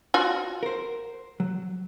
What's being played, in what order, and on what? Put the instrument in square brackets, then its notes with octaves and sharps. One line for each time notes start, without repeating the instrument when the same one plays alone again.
[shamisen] F4 F#4
[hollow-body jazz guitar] A#4 C5
F#3